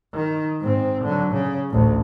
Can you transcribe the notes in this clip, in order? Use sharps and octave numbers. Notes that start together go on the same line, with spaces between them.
D#3
G#2 C4
D3 F#3
C#3
A1 D2